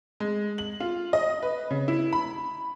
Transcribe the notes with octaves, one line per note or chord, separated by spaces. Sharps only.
G#3
F#7
F4
D#5
B4
C#3
E4
B5